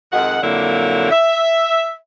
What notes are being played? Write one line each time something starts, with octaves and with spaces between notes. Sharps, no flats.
F2 D#3 G#3 F#5
F2 A#2 D3 F#3 A#3 E4
E5